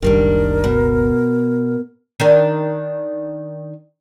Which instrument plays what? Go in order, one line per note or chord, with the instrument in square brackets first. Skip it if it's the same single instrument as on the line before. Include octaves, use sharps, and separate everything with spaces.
[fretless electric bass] F#1 C#2 [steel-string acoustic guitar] D#3 G3 D4 [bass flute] A#4
[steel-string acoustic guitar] B2
[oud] D#3 D4 A#4